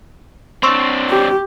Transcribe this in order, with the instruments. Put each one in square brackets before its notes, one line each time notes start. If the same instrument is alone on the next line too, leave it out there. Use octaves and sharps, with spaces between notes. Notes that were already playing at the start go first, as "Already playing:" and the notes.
[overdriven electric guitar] C4 D4 [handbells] C6 C#6 E6
[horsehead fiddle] G4